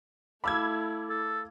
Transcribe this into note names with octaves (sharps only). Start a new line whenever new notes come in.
A3 E4 F5 A5 B5 D6 E6 G#6
A4